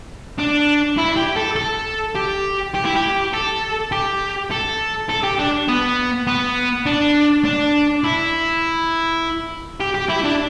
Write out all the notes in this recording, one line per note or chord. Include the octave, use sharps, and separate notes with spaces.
D4
E4
G4
A4
A4
G4
G4
E4
G4
A4
G4
A4
A4
G4
D4
B3
B3
D4
D4
E4
G4
G4
E4
D4